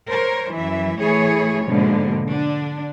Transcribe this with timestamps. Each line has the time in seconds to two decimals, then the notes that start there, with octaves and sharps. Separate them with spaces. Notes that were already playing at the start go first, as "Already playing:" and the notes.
0.10 A#4 C5 C#5
0.52 F#2 E3 E5
1.00 A2 E3 A3 E4 G#4 C#5
1.66 G#2 B2 D3 F3 G#3 A#3
2.27 D3 D4